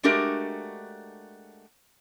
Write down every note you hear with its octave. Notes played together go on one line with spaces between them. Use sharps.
G#3 A3 D4 F#4 G4 A#4